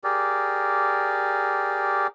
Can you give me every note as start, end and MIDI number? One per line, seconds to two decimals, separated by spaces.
0.04 2.07 67
0.04 2.07 68
0.04 2.07 70
0.04 2.07 74